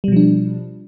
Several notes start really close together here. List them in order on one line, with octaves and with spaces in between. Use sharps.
G3 B2 F3 D4